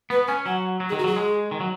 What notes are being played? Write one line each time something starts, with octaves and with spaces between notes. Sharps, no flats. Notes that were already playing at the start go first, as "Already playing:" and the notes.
B3 B4
C#4 G#5
F#3 F#5
F#3
G#4
D#3
F#4
F#3 G#4
G#3
D#3
F#3